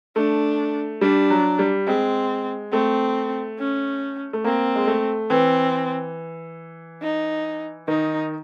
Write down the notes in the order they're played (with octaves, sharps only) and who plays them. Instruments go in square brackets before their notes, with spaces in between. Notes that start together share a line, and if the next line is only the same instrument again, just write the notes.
[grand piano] A3 [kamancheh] D4
[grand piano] G3 [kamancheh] D4
[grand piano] F#3
G3
[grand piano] G#3 [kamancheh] C4
[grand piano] A3 [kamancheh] C4
[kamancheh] C#4
[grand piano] A3
[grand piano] A#3 [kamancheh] C4
[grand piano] G#3
A3
[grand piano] E3 [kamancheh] C4
[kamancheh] D#4
[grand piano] D#3 [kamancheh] D#4